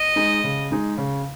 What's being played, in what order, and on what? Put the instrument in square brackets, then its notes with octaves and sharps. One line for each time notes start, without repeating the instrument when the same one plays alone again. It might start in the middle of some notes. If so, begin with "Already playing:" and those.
Already playing: [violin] D#5
[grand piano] G#3 D#4 G#4
C#3
G#3 D#4 G#4
C#3